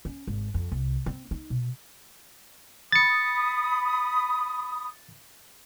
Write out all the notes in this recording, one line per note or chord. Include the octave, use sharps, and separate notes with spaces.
C#4
G#1
F2
C2
C4
D#4
B2
B5 D#6 A6 C#7